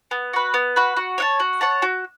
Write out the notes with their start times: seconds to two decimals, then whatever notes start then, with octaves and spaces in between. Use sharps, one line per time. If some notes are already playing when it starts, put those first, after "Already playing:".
0.11 B3
0.33 F#4 B4
0.54 B3
0.76 F#4 B4
0.97 F#4
1.18 C#5 F#5 A5
1.40 F#4
1.61 C#5 F#5 A5
1.82 F#4